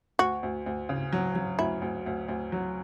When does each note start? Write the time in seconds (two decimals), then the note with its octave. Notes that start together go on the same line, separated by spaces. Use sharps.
0.19 D2 F#4
0.43 D2
0.66 D2
0.89 C#3
1.13 F#3
1.35 F#3
1.59 D2 E4
1.82 D2
2.06 D2
2.28 D2
2.52 F#3